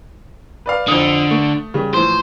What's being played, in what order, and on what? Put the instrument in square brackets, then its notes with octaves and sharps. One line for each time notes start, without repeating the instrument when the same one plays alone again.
[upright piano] B4 D5 F5
[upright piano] F2 D#6 [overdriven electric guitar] D3
[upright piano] A3
C#3 G3
[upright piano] A2 E3 F3 [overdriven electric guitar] C5